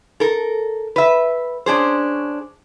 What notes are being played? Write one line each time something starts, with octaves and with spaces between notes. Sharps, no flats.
A4 A#4
B4 E5
C#4 D4 G#4 C5